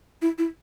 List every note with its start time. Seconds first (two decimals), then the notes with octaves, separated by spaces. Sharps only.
0.22 E4
0.38 E4